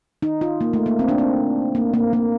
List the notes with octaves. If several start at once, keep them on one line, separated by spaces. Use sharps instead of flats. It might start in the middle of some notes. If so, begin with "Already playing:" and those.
D#4
F4
A#3
A3
A#3
C4
D4
C4
A#3
A#3
A#3